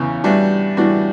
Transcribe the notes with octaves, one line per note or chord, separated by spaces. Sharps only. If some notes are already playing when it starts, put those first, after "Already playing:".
Already playing: E2 C#3 B3
A2 E3 G3 D4 F#4
A2 E3 G3 D4 F#4